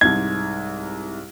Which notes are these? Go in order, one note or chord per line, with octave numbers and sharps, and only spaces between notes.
C2 G#2 G#6